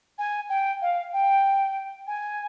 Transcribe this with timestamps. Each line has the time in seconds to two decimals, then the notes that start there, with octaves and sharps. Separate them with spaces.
0.18 G#5
0.49 G5
0.82 F5
1.13 G5
2.07 G#5